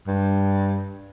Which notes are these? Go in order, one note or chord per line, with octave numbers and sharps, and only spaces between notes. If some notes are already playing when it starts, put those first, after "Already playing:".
G2